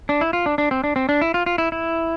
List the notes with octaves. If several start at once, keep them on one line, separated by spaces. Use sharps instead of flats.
D4
E4
F4
D4
D4
C4
D4
C4
D4
E4
F4
F4
E4
E4